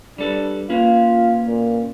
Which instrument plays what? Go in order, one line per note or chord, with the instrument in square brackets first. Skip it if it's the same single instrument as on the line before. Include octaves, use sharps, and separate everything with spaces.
[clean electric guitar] G3 A4 B4 [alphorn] D4
[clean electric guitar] A#3 C#4 B4 [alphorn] F4
[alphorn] A#2